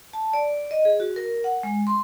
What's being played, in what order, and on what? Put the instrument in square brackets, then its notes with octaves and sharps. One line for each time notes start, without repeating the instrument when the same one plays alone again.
[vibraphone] A5
D5
D#5
G#4
F#4
A#4
F#5
G#3
C6